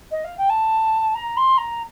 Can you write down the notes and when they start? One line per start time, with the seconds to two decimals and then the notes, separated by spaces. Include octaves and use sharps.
0.11 D#5
0.24 F5
0.38 G5
0.49 A5
1.15 A#5
1.37 C6
1.57 A#5